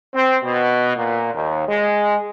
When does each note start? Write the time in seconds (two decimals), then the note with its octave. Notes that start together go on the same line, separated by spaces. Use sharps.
0.15 C4
0.44 B2
0.96 A#2
1.34 D#2
1.69 G#3